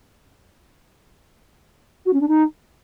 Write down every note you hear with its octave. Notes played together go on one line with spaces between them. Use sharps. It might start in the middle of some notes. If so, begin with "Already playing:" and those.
F#4
C#4
D4
D#4